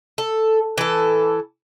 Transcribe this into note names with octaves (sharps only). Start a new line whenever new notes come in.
A4
E3 A4